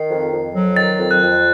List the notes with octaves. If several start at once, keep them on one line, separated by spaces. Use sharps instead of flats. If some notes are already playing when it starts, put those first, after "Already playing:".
Already playing: D#3 C7
F2
F2
F#3
D#3 A6
F2
F#6
F2